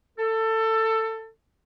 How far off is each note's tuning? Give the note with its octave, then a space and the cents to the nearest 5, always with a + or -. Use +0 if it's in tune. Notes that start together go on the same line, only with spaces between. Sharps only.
A4 +20